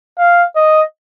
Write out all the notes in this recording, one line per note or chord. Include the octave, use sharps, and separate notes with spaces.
F5
D#5